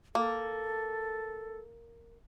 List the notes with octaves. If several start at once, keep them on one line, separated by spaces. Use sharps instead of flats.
A#3 A4